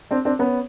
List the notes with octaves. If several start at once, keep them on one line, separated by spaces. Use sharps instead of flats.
C4 D4
C4 D4
B3 C#4